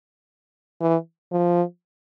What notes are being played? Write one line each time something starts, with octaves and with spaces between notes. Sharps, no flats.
E3
F3